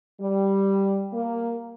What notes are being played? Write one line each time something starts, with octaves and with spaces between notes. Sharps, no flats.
G3
A#3